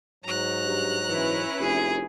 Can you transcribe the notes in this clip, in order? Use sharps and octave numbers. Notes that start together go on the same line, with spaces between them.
G#2 F#3 A#5 F#6
G2
E3 C#4 E4 B4
F1 G#4